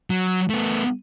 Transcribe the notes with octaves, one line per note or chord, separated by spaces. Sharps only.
F#3
A3 B3